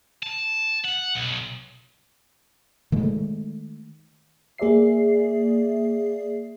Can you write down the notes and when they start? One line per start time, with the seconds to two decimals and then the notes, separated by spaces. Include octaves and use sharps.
0.23 A5
0.84 F#5
1.15 B1
2.92 D#3 G#3 A3
4.58 A#3 G#4 D5 E5 C7